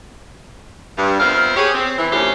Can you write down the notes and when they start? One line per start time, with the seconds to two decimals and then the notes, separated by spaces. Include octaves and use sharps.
0.98 G2
1.20 F2 B3 A#4 C5 E5 F5
1.56 G4 G#4 C#5
1.74 C4
1.98 E3
2.12 D2 A#2 A3 C#4 G4 C5